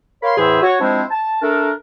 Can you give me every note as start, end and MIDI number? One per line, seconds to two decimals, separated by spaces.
0.23 0.35 70
0.23 0.35 73
0.23 0.35 77
0.23 0.35 83
0.23 0.35 84
0.38 0.60 40
0.38 0.60 45
0.38 0.60 52
0.38 0.60 68
0.38 0.60 72
0.38 0.60 76
0.62 0.76 66
0.62 0.76 73
0.80 1.04 53
0.80 1.04 56
0.80 1.04 60
0.80 1.04 62
0.80 1.04 64
0.80 1.04 72
1.11 1.41 81
1.42 1.72 57
1.42 1.72 62
1.42 1.72 69
1.42 1.72 70